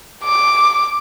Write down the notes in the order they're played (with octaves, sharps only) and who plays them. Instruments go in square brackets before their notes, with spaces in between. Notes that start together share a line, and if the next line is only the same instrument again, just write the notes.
[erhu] D6